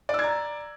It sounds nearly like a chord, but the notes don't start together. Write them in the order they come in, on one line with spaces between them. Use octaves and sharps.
D5 E6 G#6 A#5